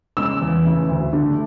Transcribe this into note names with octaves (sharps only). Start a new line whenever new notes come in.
C#3 G#3 E6
E2
C#3 E3 A3
D2
D3 A3